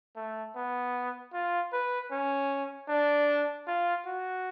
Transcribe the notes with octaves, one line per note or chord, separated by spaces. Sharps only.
A3
B3
F4
B4
C#4
D4
F4
F#4